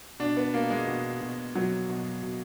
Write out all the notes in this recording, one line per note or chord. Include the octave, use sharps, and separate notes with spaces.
B2 D4
B3
B2 A#3
G#3
B2
B2
B2 F#3
B2
B2